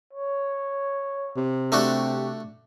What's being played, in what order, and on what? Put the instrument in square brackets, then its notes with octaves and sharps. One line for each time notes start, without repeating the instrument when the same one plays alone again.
[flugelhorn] C#5
[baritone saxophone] C3
[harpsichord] A3 D4 F#4 [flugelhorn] G4